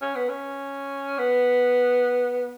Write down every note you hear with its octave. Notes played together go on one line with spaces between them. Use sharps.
C#4
B3
C#4
B3